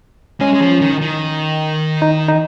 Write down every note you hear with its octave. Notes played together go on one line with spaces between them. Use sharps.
G#3 C#4
G#3
F3
D#3
D#3
D#4
D#4